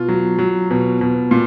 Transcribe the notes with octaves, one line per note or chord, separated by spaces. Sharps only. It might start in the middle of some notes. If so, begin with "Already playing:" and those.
Already playing: B2 F4
F#3
F#3
B2
B2
A#2